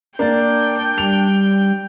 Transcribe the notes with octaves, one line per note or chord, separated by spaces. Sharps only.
A#3 D4 D5 G5
G3 F7